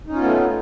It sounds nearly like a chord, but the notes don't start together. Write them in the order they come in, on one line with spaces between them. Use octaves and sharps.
D#4 C#4 F4 B3 A3